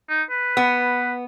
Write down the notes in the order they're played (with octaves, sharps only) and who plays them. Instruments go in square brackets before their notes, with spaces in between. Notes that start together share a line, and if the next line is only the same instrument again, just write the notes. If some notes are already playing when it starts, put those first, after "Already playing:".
[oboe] D#4
B4
[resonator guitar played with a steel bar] B3